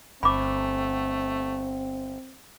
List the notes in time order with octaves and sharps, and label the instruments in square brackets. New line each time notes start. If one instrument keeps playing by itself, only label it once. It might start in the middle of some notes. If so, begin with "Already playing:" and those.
[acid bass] G1 [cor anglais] A3 [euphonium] C4 [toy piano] B5 D6